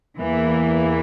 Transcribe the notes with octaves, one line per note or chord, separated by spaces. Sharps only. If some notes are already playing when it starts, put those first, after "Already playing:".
E2 E3 A#3